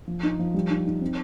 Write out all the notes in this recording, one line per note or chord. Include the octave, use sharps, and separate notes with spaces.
F3
D#4
F3
G3
D#4
D#4
C4